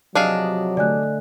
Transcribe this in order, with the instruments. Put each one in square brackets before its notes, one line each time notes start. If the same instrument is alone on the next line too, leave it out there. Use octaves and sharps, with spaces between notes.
[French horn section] C3 F3 F#3 [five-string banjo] D4 G#4 F5 [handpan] D#5
[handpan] D3 A3 [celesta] D5 G#5 F#6